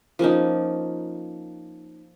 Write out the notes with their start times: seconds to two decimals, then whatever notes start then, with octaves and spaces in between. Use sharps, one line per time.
0.19 F3 A#3 C#4 D#4